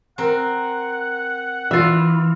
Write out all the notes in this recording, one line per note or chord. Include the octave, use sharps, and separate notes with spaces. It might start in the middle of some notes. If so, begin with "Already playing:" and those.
C4 A#4 F#5
E3 F4 E5